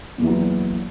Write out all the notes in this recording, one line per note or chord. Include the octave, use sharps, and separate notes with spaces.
E2 A#2 E3 F#3